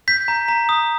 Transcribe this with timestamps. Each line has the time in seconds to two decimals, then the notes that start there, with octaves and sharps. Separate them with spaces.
0.08 G6 B6
0.28 A#5
0.48 A#5
0.69 D#6